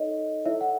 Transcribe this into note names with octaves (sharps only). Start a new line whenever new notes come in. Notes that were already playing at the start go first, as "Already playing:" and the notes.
Already playing: D#4 A4 C#5 D#5
E4 A4 C#5 E5
F#5